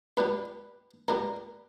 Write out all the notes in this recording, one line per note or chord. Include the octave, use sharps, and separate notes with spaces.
C#2 B2 G3 B4
C#2 B2 G3 A#4